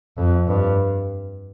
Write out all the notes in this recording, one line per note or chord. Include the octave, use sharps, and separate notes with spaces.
F2
G2